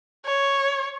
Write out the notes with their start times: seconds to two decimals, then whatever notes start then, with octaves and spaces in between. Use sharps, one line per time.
0.25 C#5